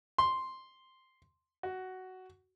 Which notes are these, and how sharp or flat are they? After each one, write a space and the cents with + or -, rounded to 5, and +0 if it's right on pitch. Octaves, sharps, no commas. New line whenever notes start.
C6 +0
F#4 +10